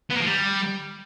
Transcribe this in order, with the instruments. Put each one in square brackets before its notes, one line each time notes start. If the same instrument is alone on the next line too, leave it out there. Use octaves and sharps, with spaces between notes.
[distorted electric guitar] B3
A#3
F3
G3